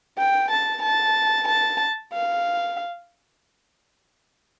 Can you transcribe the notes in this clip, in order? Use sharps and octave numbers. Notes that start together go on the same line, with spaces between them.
G5
A5
A5
A5
F5